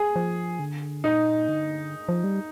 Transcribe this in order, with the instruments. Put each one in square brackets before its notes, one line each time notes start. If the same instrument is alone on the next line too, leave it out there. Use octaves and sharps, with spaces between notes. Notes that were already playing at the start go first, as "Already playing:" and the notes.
Already playing: [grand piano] G#4
[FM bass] F3
D3
[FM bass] A#2 [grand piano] D#4
[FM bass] D3
F3
G3